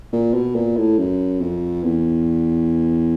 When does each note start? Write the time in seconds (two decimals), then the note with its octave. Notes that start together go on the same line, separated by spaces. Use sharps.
0.13 A#2
0.34 B2
0.55 A#2
0.77 A2
0.99 F#2
1.41 F2
1.83 E2